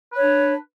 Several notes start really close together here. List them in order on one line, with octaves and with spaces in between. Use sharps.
B4 C#5 D4